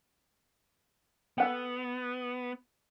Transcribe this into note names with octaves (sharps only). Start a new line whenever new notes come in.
B3 A4 F#5 G5